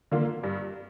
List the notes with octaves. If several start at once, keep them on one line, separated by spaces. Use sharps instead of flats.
D3 A#3 F4
G2